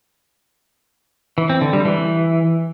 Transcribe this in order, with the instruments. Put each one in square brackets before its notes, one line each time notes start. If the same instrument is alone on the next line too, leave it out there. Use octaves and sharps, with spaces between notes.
[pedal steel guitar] E3
C4
D3
G3
E3